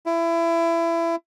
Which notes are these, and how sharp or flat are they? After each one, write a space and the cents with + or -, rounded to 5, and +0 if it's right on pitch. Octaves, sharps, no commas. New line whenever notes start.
E4 +25